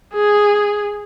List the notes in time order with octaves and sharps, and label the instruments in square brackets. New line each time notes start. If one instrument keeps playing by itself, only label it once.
[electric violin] G#4